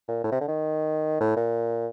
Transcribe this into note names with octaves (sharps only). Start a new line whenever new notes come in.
A#2
A2
C3
D3
D#3
A2
A#2